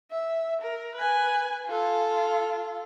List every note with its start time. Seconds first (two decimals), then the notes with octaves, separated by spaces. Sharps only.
0.11 E5
0.61 A#4
0.95 B4 G#5
1.66 F4 A4